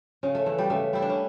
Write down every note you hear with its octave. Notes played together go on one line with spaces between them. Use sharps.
C#3 C#4
A3
E3 A3
G3
C#3 A3
G3 E4
D4
C#4